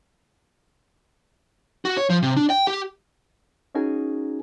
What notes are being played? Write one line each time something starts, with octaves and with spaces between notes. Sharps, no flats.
F#4
C#5
F3
C3
D4
G5
G4
C#4 D#4 F#4 G#4 A#4 G#5